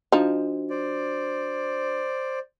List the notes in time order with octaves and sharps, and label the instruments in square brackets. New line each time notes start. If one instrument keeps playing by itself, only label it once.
[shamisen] F3 D#4 [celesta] D4 F#4
[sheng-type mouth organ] C5 D5